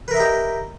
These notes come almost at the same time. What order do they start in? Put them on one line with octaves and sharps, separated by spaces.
B4 A#4 E5 D#5 G4